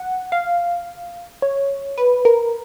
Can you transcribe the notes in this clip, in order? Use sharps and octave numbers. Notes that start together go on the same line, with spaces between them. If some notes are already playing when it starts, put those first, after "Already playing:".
Already playing: F#5
F5
C#5
B4
A#4